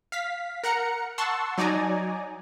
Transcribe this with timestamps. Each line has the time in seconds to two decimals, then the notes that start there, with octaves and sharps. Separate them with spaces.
0.12 F5 B6
0.64 A#4 F#5 A#5 C#7
1.18 F#5 A5 C6 C#6 E6
1.58 F#3 D#4 D5 G#5 A#5